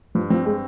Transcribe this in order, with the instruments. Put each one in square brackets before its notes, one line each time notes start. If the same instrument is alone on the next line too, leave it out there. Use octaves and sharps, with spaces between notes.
[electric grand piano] G2 [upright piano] F3
[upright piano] F3 [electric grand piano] C4
[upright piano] G#3 [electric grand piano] C4